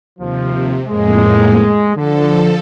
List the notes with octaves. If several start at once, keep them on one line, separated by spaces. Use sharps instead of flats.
D#2 C3 F3
F2 A2 G#3 A#3
D3 F3 A4